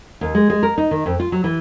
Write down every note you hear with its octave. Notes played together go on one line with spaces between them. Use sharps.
D#2
G#3
G#3
A#4
D#4
D#3
F2
F4
F#3
E3